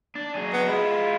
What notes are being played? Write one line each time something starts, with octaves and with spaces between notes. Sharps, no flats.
D4
F#3 G#4
B3
G#3 E4 F4